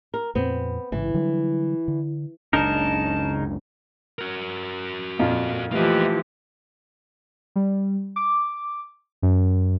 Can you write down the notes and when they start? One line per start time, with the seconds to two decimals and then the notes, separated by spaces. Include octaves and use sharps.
0.14 A#4
0.35 F2 A#2 B3 C4
0.92 A1 G#2 C#3 E3
1.14 D3 F#3 G3
1.88 D3
2.53 F#1 C#2 C#3 D4 D#4 A#4 A5
4.19 F#4 A#4
5.19 F2 A#2 F4
5.72 E3 F3 A3 A#3 G4 D#5
7.56 G3
8.16 D6
9.22 F#2